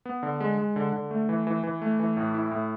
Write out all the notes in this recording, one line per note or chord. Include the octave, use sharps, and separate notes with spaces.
B3
D3
G#3
G#3
D3
D3
A3
E3
E3
E3
A3
E3
A2
E4
A2